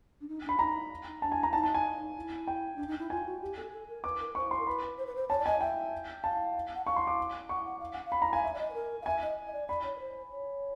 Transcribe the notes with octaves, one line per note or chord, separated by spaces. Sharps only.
D4
D#4
D4 B5
D#4 A#5
D4 A5
G#5
A#5
D#4 A5
A5
G#5
E4
G5
D4
D#4
E4
F4 G#5
F#4
G4
A4
A4
A#4
B4 D6
A#4
C5 C#6
C6
A#4
B4 B5
C5
B4
C5
C#5 A5
D5
D#5 G#5
E5 G5
F5 A5
F#5
F5 C#6
C6
D6
F#5 C#6
F#5
F5
F#5
F5
B5
A#5
F5 G#5
E5
D5
D#5
B4
A#4
F5
E5 G#5
D#5
D#5
D5
D5 B5
C#5
B4
C5
C#5